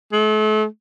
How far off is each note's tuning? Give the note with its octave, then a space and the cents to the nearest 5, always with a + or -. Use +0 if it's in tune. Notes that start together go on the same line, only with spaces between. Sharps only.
A3 -40